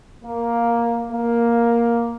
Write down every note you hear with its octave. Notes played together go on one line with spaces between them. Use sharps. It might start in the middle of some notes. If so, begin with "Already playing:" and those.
A#3
A#3